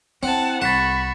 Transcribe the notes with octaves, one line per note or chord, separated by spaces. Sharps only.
C4 E4 F#5 A5
C2 F#5 B5 C#6 A6 B6 E7